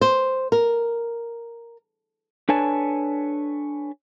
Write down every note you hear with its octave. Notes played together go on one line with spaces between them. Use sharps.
C5
A#4
D4 A4 B4 C#5 G#5 A5